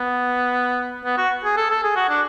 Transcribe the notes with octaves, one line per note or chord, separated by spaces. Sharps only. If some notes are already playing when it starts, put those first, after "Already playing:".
Already playing: B3
B3
F#4
G#4
A4
A4
G#4
F#4
D4